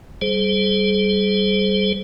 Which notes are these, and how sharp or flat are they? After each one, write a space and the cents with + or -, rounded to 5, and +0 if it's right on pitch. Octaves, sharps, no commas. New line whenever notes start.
G3 -10 G#4 +30 C5 +0